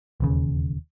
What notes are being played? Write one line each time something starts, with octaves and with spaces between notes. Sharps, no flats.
E1 D#2 C#3